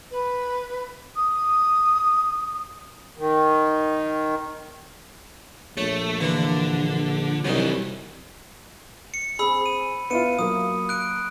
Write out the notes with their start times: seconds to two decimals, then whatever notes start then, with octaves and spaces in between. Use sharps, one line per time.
0.11 B4
1.16 D#6
3.18 D#3
5.77 A#1 A3 C#5
6.21 D3 E3 A#3
7.45 C2 D#3 E3 F#3 C#4 D#4
9.14 C#7
9.39 C4 G#4 B5 E6
9.66 D#7
10.10 B3 E4 F4 C#7 D#7
10.39 F#3 A#3 D#6
10.89 F#6 D7